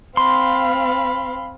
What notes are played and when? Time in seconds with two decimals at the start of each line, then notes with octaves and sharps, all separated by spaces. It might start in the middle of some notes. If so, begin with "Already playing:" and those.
0.17 C4 F5 B5 C6